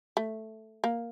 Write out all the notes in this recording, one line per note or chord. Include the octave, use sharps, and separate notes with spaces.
A3
A#3